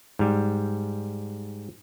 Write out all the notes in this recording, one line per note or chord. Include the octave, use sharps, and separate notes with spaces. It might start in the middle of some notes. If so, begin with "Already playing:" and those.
G#2 G3